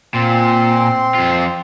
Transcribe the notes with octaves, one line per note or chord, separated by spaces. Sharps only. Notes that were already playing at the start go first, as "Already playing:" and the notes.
A#2 C4 C6
F2 F4